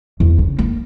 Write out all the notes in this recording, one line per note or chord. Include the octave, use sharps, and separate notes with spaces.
E2
C#3
A#3